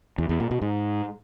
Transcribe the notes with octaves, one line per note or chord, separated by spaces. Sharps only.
E2
E2
A#2
B2
G#2